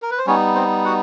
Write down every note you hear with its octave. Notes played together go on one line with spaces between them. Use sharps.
A#4
B4
C5
G3 B3 C#4 D#4 C#5
C4 C5
F#4 F#5